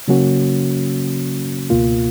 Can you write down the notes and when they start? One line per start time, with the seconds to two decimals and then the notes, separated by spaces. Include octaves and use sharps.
0.08 C#3 F#3 A#3 C#4 F#4
1.70 C#2 B2 A#3 F4